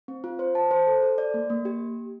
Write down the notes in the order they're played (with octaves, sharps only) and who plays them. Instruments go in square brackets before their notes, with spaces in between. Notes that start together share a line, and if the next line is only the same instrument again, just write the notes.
[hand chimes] C4
F4
C5
A5
C5
A4
A4
D5
A#3
A#3
G4